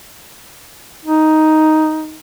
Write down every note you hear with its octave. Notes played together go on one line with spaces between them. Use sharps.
D#4